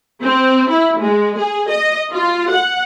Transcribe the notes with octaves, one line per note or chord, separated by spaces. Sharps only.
C4
E4
G#3
G#4
D#5
F4
F#5